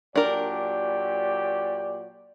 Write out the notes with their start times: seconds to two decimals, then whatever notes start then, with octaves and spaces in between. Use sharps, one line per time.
0.16 A#2 F#3 D4 G4 A#4 D5